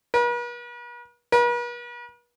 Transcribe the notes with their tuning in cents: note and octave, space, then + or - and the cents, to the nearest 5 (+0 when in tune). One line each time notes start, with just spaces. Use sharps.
B4 -45
B4 -45